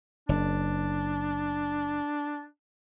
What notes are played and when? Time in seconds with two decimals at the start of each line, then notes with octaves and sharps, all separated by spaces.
0.29 F#1 D4